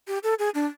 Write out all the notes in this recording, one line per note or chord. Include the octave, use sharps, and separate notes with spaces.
G4
A4
G#4
D4